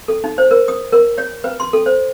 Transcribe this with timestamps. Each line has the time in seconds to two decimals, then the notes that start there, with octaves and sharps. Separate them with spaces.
0.08 A4
0.24 D#4
0.38 C5
0.51 A#4
0.68 D#6
0.93 A#4
1.18 C#5
1.44 B4
1.60 C6
1.73 A4
1.86 C5